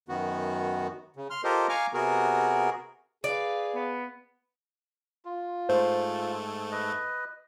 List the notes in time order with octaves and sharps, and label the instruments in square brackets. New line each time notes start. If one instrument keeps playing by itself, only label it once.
[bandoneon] F#2 D#3 B3 F#4
C#3
C6 F6
F4 G4 A4 A#4 C5 D#5
F5 G#5 A#5 C#6 D6 F6
C3 B3 F#4 G#4 A#4
[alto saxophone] G#4 [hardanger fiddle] B4 F5 [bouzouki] D5
[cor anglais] B3
[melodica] F4
[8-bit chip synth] G#2 A3 [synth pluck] C5
[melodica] B4 D#5